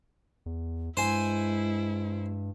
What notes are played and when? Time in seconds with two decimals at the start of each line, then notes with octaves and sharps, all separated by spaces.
0.46 E2
0.97 G2 G#3 E4 C5 G#5